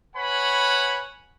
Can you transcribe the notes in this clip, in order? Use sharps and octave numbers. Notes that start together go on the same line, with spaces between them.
B4 C#5 F#5 G#5 B5